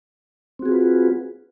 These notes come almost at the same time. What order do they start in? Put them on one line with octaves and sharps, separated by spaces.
C4 F#4 G#4 F4 B4